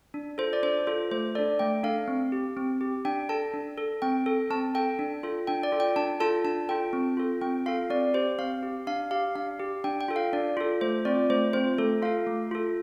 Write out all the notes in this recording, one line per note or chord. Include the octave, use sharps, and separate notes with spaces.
D4
F4 A4 C5
D5
D4 C5
F4 A4 C5
A3 C5
D4 A4 D5
A3 G5
D4 A4 F5
C4
G4
C4
G4
D4 G5
A4 A5
D4
A4
C4 G5
A4
C4 A5
A4 G5
D4
F4 A4
D4 G5
D5
F4 A4
G5
D4 A5
F4 A4 A5
D4 A5
F4 A4 G5
C4
F4 A4
C4 G5
F4 A4 F5
C4 D5
G4 C5
C4 F5
G4
D4 F5
G4 F5
D4 F5
G4
D4 G5
G5
F4 A4
F5
D4 D5
F4 A4
A3 C5
C4 F4 D5
A3 C5
C4 F4 C5
A3 A4
F4 A4 F5
A3
F4 A4